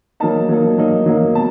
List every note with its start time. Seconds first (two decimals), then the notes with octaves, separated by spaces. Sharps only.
0.20 F#3 A#3 D#4 A5
0.49 F#3 A#3 D#4
0.78 F#3 A#3 D#4
1.06 F#3 A#3 D#4
1.35 B2 A5